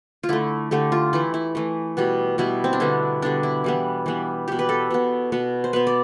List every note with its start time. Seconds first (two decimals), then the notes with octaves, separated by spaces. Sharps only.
0.23 F4
0.29 D3 A3 E4
0.71 D3 A3 G4
0.92 F4
1.13 E3 A3 E4
1.34 E4
1.55 E3 A3
1.97 B2 G3 B3
2.38 B2 G3 B3 E4
2.64 C4
2.73 D4
2.80 D3 G3 B3 E4
3.22 D3 G3 B3 D4
3.43 E4
3.64 E3 G3 B3
4.06 E3 G3 B3
4.48 B2 B3 G4
4.59 B4
4.69 A4
4.90 B2 B3
5.32 B2 B3
5.64 C5
5.73 B2 B3 B4
5.87 D5